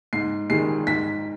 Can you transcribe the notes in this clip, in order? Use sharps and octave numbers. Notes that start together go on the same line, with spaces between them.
G#2 C7
D#3 G#3 C7
G#2 B6